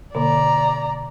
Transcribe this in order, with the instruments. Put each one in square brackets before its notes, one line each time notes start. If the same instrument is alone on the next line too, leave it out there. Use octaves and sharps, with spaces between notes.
[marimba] B2 D3 A#3 [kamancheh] D5 A#5